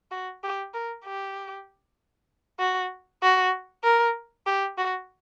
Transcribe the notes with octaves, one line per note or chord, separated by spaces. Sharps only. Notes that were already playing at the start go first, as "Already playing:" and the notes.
F#4
G4
A#4
G4
F#4
F#4
A#4
G4
F#4